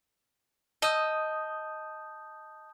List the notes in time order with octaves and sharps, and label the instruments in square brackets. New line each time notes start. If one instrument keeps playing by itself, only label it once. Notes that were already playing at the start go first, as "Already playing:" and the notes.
[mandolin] D#5 E6 [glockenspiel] A5 D#6 G6